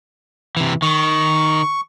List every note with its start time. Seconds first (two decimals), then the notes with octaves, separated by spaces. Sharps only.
0.57 C3 E3
0.82 D#3 C#6